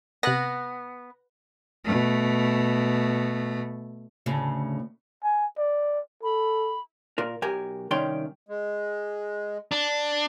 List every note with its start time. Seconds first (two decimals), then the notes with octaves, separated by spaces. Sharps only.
0.23 C3 B3 F#6 A#6
1.84 B2 A3
4.26 D2 A2 C#3
5.24 G#5
5.58 D5
6.23 A4 B5
7.18 A#2 F4 A#4
7.42 B1 G4 A#4 G#5
7.91 C2 D#3 C#4 D5 G5 C6
8.49 G#3
9.71 D4